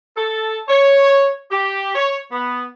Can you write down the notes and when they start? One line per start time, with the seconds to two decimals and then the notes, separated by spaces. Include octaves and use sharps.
0.17 A4
0.68 C#5
1.51 G4
1.95 C#5
2.32 B3